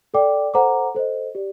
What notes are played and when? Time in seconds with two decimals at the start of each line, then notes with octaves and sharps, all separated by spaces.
0.14 A4 D5 G5 D6
0.54 A4 C5 F#5 A#5 D6
0.95 A4 C5 D#5
1.35 G4 D5